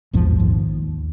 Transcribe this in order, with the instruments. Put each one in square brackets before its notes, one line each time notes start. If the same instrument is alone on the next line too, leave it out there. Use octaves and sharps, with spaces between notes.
[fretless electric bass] A#1 E2 G#2 F3
D#2